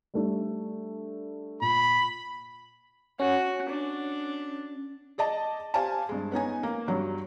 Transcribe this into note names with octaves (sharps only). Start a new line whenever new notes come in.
G3 A3 D4
A#2 B5
C#4 F#4
D4
G#4 D5 D#5 A5
G4 C5 D5 F5 G#5 A5
G2 G#3
B3 C#4 D#4 G#5
A#3
G2 F#3 G3